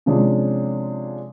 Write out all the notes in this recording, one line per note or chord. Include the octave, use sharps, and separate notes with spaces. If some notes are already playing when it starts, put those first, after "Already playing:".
C3 F3 G#3 C#4 D4